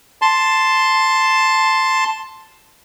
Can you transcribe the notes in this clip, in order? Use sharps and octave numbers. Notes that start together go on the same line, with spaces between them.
A5 C6